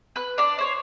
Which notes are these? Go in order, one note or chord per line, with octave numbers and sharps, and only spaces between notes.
B4 F#6
D4 D5
C5 C#5